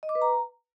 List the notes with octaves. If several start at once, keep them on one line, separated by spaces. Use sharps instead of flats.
D#5
D6
B4
A#5